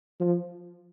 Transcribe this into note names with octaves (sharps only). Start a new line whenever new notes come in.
F3